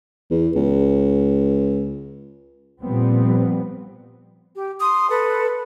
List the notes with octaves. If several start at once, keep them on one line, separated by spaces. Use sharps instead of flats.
E2
C#2
A#2 F3 G3 B3 C4
G4
C6 D#6
A4 B4